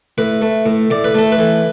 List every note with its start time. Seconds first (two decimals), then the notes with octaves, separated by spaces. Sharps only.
0.18 A2 B4
0.42 A3
0.66 A2
0.90 A2 D5
1.04 B4
1.15 A3 A4
1.32 B4
1.39 E3